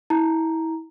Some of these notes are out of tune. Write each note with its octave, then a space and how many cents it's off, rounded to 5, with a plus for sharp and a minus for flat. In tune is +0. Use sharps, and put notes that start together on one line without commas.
E4 -25 A#5 +0